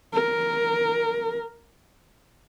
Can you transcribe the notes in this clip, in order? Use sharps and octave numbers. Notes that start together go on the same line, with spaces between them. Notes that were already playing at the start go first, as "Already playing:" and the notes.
A#4